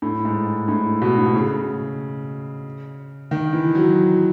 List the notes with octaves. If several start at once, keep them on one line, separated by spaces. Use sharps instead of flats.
A2
G#2
A2
B2
A2
B2
C#3
D#3
E3
F#3